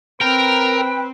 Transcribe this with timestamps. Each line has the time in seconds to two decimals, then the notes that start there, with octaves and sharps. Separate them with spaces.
0.21 C4 A#4 B4 G5